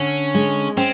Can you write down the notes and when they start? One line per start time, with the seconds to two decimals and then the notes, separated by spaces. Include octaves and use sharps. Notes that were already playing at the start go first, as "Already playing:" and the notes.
Already playing: D3 C#4
0.34 G#3
0.77 C4 C#4